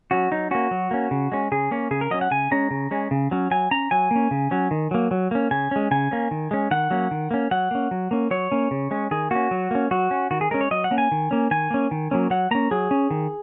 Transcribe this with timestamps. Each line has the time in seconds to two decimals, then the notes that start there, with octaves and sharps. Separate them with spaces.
0.11 F#3 C#4 F#4
0.31 F#3 D#4
0.51 A#3 C#4 F#4
0.71 F#3
0.91 A#3 C#4
1.11 C#3
1.32 G#3 C#4
1.52 C#3 G#4
1.71 A#3 C#4
1.91 C#3 G#4
2.01 A#4
2.11 F#3 C#4 D#5
2.21 F#5
2.31 C#3 G#5
2.51 G#3 C#4 A#5
2.71 C#3
2.91 G#3 C#4
3.11 C#3
3.31 F#3 C#4
3.51 F#3 G#5
3.71 C#4 A#5
3.91 F#3 G#5
4.11 A#3 C#4
4.31 C#3
4.51 F#3 C#4
4.71 D#3
4.91 F#3 A#3
5.11 F#3
5.31 A#3 C#4
5.51 C#3 G#5
5.71 G#3 C#4
5.91 C#3 G#5
6.11 A#3 C#4
6.31 D#3
6.51 G#3 C#4
6.71 D#3 F#5
6.91 F#3 A#3 C#4
7.11 D#3
7.31 A#3 C#4
7.51 F#3 F#5
7.71 A#3 C#4
7.91 F#3
8.11 A#3 C#4
8.31 F#3 C#5
8.52 A#3 C#4
8.71 C#3
8.91 G#3 C#4
9.11 D#3 G#4
9.31 A#3 C#4 F#4
9.51 F#3
9.71 A#3 C#4
9.91 F#3 F#4
10.11 C#4
10.31 D#3 F#4
10.41 G#4
10.51 G#3 C#4 A#4
10.61 C#5
10.71 F#3 D#5
10.84 F#5
10.91 A#3 C#4
10.98 G#5
11.12 D#3
11.31 A#3 C#4
11.51 D#3 G#5
11.71 A#3 C#4
11.91 D#3
12.11 F#3 A#3 C#4
12.30 F#3 F#5
12.51 A#3 C#4 A#5
12.71 F#3 G#4
12.91 C#4
13.10 D#3